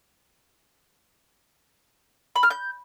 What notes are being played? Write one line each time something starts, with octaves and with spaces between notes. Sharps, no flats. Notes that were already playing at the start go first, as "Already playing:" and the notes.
B5
F6
G6